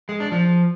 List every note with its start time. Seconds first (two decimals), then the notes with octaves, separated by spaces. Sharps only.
0.09 G#3
0.20 D4
0.32 F3